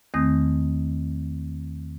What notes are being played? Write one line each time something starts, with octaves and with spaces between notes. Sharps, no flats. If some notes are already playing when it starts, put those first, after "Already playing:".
E2 D#3 A3 C4 D#6 A#6